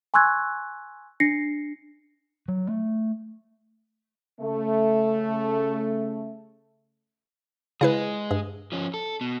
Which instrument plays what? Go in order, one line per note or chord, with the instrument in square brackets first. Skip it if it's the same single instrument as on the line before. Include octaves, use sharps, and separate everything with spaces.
[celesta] G#5 C6 C#6 E6 F#6 G#6
D4 A#6 C7 C#7
[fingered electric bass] F#3
A3
[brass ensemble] C#3 A3
[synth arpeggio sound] C#3 E4 B4 [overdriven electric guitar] G#3 G#4
[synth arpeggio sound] G2
[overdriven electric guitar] F3 C#4
A4
B2